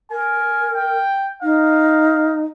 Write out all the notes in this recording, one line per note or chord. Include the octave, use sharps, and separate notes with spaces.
A#4 G#5
G5
D#4 F5